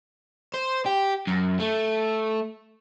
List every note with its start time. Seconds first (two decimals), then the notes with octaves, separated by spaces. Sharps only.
0.54 C5
0.86 G4
1.27 F#2
1.60 A3